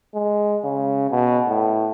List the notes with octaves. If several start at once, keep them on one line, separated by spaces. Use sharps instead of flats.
G#3
C#3
B2
A2